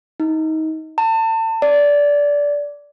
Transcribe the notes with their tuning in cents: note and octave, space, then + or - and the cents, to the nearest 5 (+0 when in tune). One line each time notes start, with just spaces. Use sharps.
D#4 +25
A5 +35
D5 -15